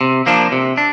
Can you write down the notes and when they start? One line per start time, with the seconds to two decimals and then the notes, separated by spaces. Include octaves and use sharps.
0.01 C3
0.26 F3 A#3 D4
0.52 C3
0.77 D4